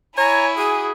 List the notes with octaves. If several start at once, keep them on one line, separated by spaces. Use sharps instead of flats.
E4 C#5 G#5 A#5
F#4 G#4 G#5